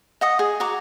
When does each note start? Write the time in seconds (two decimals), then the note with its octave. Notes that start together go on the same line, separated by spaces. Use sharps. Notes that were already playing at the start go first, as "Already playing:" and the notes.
0.21 D#5 F#5 D#6
0.39 G#4
0.60 F#4 A#5 D6